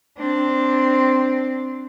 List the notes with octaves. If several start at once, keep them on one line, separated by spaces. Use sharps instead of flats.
C4 D4